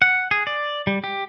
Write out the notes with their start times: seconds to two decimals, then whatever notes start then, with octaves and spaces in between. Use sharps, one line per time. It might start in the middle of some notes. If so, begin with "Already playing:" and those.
0.02 F#5
0.31 G#4
0.47 D5
0.87 G3
1.04 G4